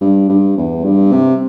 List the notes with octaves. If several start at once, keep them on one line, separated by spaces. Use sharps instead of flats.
G2
G2
E2
G2
C3